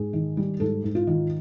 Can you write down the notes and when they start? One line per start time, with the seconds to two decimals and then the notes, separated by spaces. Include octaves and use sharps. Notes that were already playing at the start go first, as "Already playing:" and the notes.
Already playing: G#2 G#4
0.13 D#3
0.37 G3
0.60 G#2 A4
0.84 G#2
0.95 F4
1.07 D#3